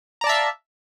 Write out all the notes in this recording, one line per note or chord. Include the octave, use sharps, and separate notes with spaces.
D5 E5 F5 A5 A#5